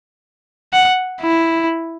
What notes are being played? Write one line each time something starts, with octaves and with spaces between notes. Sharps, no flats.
F#5
E4